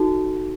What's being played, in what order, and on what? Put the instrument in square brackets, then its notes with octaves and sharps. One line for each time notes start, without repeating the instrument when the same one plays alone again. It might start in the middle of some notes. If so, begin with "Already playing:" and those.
Already playing: [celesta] D#4 F#4 A4